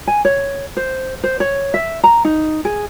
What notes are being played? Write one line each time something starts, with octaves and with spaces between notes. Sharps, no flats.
G#5
C#5
C5
C5
C#5
E5
A#5
D#4
G#4